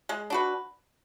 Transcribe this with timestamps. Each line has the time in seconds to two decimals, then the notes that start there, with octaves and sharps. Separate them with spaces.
0.09 G#3
0.30 D4 F#4 B4